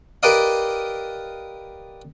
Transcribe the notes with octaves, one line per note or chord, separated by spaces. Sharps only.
G4 A#4 B4 D5 D#5 F5